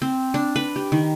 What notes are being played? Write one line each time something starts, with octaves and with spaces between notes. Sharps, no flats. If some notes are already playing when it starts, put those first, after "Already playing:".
C4
D4
B4
G4
D#3